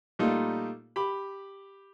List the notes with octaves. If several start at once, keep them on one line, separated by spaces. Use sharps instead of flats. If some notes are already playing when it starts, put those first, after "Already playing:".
A#2 G3 A3 A#3 D#4 F4
G4 B5